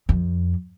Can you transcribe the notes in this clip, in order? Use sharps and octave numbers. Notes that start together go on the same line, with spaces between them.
F2